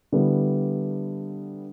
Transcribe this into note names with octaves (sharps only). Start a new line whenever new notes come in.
D3 G3 B3 E4